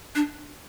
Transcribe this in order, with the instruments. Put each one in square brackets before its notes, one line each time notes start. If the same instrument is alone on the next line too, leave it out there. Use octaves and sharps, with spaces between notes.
[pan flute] D4